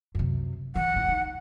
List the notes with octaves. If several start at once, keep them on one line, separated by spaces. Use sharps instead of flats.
F#2 C3
E3 F#5
F1 E4
D#4